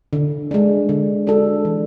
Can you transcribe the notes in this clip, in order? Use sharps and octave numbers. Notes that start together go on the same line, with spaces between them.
D3
G#3 D4
D3
G#3 D4 F#4 A4
E3